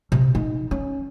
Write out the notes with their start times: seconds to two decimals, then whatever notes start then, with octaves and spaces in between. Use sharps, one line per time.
0.12 C3
0.35 D#4
0.71 C#4